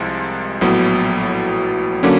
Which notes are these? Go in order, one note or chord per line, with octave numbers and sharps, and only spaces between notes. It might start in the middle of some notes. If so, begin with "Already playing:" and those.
Already playing: C2 C3 F3 G#3
A#1 A2 F#3 B3
D3 F#3 A#3 C#4